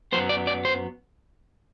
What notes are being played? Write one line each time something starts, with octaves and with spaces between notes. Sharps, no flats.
F#2 F#3 B3 C5
D5
D5
C5